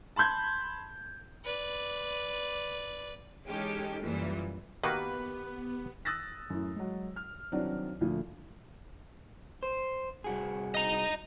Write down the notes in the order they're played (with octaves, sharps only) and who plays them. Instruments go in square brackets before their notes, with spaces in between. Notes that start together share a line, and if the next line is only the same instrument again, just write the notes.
[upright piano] A5 B5 C6 G6 G#6
[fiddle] B4 D5
[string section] E3 G#3 C#4 D#4 G4 A4
F#2 A#2 E3 G3
[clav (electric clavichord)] D#3 A#3 F#4 [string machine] B3 [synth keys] G4 [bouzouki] B4
[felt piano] D#6 E6 F#6 A6 A#6
F#2 A2
F#3 G#3
F6
C2 D#3 F#3 C4 D4 D5
D2 A#2 F3 A3
[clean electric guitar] C5
C2 F#4 G#4
[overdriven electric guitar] D#5 A#5